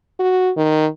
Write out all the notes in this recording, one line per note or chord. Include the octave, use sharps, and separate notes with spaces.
F#4
D#3